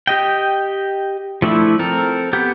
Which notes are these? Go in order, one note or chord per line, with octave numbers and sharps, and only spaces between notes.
G4 D#5 G5
F3 A3 D4 E4
C4 A4 A#4
B3 G4 F#5 G6